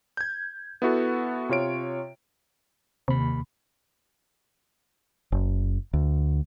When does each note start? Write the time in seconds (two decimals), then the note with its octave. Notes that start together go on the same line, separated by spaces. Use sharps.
0.17 G6 G#6
0.82 B3 E4 F#4 A4
1.49 C3 F4 C#5 D7
3.08 D#2 C3 B5
5.32 F#1
5.93 D2